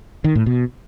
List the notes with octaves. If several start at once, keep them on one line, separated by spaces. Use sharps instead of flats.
D#3
A2
B2